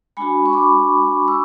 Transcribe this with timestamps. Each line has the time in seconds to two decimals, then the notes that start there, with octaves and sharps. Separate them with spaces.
0.17 G#3 D4 F#4 G#5 B5
0.46 C#6
0.53 B5 D6
1.28 C#6 E6